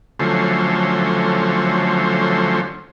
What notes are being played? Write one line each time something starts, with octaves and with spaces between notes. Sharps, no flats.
D3 F3 F#3 A3 C#4 C5